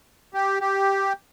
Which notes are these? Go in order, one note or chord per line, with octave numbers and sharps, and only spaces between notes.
G4
G4